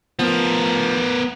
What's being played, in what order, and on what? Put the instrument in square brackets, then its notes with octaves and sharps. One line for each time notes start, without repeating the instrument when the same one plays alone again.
[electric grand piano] F3 [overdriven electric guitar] B3 A#4